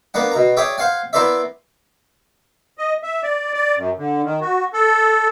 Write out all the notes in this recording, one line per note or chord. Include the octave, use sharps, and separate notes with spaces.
A#3 B3 D4 F#5
B2 A#5
G#4 C#5 D5 E5 G5
C5 F5 F#5 G#5
B3 E4 A#4 C5 D5 E5
D#5
E5
D5
D5
F#2
D3
D#3
F#4
A4